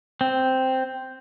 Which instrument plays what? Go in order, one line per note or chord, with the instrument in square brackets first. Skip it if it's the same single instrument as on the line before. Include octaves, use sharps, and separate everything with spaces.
[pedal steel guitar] C4